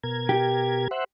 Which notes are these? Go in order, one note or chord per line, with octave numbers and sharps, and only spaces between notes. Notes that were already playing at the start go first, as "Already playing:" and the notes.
B2 A#4 G#6
G4
C5 E5 F#5